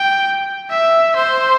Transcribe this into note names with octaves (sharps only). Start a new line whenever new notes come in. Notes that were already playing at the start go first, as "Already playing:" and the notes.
Already playing: G5
E5
C5